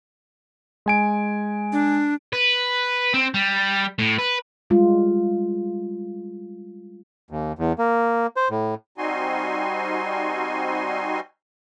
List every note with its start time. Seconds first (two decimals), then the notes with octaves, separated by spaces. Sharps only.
0.86 G#3 G#5 D7
1.73 D4
2.33 B4
3.14 C4
3.34 G3
3.99 A2
4.19 B4
4.70 G3 G#3 F4
7.31 D#2
7.59 E2
7.79 A#3
8.37 C5
8.50 A2
8.98 G3 C4 D#4 F#4 G#5 C6